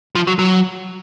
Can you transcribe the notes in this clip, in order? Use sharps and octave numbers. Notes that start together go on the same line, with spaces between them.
F3
F#3
F#3